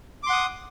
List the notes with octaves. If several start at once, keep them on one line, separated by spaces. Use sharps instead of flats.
F#5 C6 D6 D#6